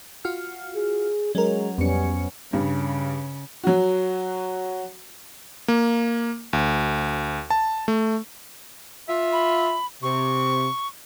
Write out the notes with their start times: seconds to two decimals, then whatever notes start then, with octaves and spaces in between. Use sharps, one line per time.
0.25 F4 F#4 F6
0.76 G#4
1.35 F#3 G#3 C#4 A#4
1.78 F2 G3 B3 C#4 C#7
2.53 G2 C#3
3.64 F#3 F#4
5.68 A#3
6.53 D2
7.50 A5
7.88 A3
9.08 F4 E5
9.33 B5
10.03 C3 C#6